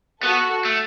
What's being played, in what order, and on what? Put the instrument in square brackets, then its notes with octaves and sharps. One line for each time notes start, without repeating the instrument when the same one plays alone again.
[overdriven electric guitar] B3 [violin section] F#4 A4
[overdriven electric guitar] A3